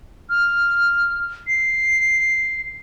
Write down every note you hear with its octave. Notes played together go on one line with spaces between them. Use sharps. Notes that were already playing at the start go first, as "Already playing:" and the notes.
F6
C7